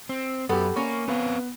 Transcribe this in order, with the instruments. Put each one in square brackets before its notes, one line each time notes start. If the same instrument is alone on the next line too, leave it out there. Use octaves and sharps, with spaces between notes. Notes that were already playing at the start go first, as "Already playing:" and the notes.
[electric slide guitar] C4
[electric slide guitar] F#2 [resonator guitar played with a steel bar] B3 [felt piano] G4 A4
[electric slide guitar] A#3 [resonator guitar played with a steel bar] C#4 [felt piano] C#6
[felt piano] B3 [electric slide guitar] C4 B4 F5